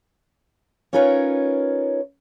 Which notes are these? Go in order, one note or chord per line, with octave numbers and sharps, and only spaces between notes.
C#4 D#4 F4 A#4 B4 C#5